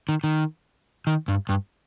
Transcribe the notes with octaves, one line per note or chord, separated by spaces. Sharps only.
D#3
D#3
D#3
G2
G2